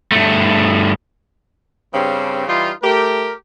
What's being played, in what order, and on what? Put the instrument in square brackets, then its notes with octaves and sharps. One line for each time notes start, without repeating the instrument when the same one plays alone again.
[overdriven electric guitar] G2 A3
[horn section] G2 C#3 C4
E3 G3 D#4 F4
A3 G4 A#4